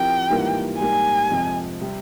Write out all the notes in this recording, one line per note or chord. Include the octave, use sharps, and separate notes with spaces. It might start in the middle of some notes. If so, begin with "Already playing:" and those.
Already playing: F3 C4 E4 G4 A#4 G5
G#2 E3 G3 A#3 F4
G#2 G3 A#3 G#5
F2 C3 F3 G#3 C4
C3 G3 C4